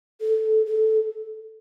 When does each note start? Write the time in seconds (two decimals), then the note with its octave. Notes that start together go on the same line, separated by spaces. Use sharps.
0.21 A4
0.66 A4